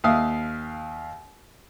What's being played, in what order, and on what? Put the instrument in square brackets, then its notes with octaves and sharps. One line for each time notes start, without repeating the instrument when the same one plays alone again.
[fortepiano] D#2 E5 F5 D#6